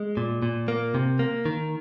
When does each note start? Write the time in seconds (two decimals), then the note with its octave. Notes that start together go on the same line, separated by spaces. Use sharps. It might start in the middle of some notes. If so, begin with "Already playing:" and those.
Already playing: G#3
0.17 A#2
0.42 A#2
0.68 A#3
0.95 C3
1.19 A#3
1.46 D#3